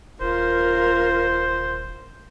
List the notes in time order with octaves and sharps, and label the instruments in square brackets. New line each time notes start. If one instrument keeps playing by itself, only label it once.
[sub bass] D#1 [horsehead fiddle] F4 A#4 [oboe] C5